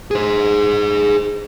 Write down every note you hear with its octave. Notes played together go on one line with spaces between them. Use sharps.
G#4 C5